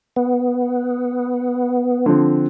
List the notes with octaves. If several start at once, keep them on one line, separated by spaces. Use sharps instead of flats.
B3
D3 F3 C4